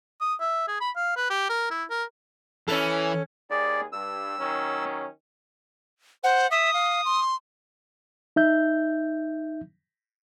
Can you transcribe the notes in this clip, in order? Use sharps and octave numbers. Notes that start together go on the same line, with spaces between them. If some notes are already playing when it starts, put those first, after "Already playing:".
D#6
E5
G#4
B5
F5
B4
G4
A#4
E4
A#4
E3 C#4 A4
D#2 G#4 D5
G2 E6
D#3 F#3 C#4
C5 F#5
E5 D#6
F5
C6
D#4 E5 G6